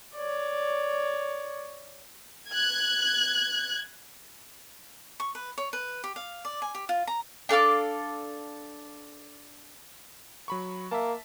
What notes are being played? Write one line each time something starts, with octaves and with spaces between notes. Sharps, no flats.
C#5 D5
F#6 G#6
C#6
B4
C#5
B4
G4
F5
D5
G#5
G4
F4
A#5
D4 A4 F5 D6
F#3 B5 C#6
A#3 E5 A5